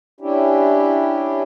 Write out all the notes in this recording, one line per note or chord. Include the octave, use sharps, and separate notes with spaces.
C#4 D4 E4 G4